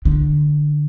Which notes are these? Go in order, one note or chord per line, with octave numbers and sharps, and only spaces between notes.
D3